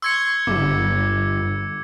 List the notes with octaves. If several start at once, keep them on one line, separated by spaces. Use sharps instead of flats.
C6 C#6 E6 G#6 C#7
G1 D6